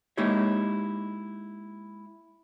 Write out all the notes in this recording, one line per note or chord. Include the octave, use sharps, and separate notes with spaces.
G#3 A#3 D#4 E4 G4 C#5